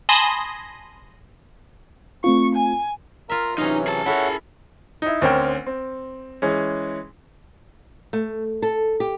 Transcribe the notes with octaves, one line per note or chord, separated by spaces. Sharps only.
G#5 A5 B5 C6 D#6 A#6
A3 C4 F4 C#6
G#5
F4 A#4 E5 A#5
C3 E3 F#3 C#4 D#4 C#5 F5
G#4 A5
E4 A4 A#4 C#5 E5 F#5
D#4 E4
D2 C4 C#4 A#4 G5
C4
E3 G#3 C#4
A3
A4
G4